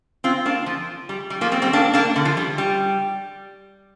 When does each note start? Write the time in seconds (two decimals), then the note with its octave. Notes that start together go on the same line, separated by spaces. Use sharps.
0.24 C4 F4
0.46 A#3 D4
0.66 F3
1.09 G3
1.30 G3
1.41 F3 A#3
1.52 G3 C4
1.62 G3 C4
1.73 A#3 D4
1.94 A#3 D4
2.16 D3
2.25 F3
2.37 G3
2.58 G3